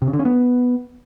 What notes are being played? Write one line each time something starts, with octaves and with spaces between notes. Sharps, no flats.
C3
C#3
D3
C#4
B3